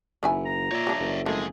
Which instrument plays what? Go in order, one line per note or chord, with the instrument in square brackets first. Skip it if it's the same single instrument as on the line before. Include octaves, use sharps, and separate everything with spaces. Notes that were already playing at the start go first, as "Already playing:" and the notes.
[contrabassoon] F#1 [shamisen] D#3 E4 G#5
[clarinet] A#5
[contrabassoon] A#2 [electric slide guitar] C#5 D5 E5
[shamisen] G3 D4
[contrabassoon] F#1
[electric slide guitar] F2 G#4 [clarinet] G#3 [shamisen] A3